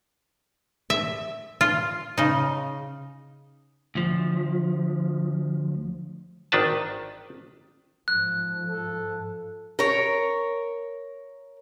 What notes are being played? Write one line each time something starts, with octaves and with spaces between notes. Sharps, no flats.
E5
F4
C#3 D#4
D2 F3
G#1 D#3 D4 B4 A5
G#2 F3 F#6
A4
A#4 C#5